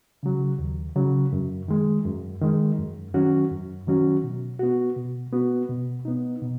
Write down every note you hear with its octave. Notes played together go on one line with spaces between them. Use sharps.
C#3 F#3
D#2
C#3 F#3
F#2
D#3 G#3
F#2
D#3 G#3
F#2
D#3 F#3 C#4 F#4
F#2
D#3 F#3 C#4 F#4
B2
B3 F#4
B2
B3 F#4
B2
B3 D#4
B2